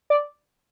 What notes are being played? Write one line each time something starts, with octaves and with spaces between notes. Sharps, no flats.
D5